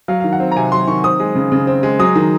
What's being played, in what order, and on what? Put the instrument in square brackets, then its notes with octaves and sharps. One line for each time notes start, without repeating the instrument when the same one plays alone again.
[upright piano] F#3 F5
D#3 F5
F#5
C4
A#5
C3 G#5
F#3 C6
D#3 C#6
C4 D#6
G#3
C#3
C#3
C4
G#3
F#3 D#6
D#3